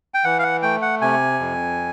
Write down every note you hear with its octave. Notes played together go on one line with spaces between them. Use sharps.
G5
E3 F#5
F5
F#5
A3 G5
F#5
C3 G#5
F2